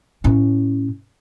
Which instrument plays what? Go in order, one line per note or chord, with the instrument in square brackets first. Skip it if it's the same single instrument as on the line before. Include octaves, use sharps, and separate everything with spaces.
[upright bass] A2 C#4